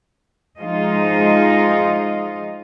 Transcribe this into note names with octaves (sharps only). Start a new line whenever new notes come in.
F3 G#3 D#4 F4 D#5